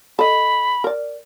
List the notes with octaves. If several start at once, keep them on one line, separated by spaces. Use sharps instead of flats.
A4 D#5 B5
A#4 D5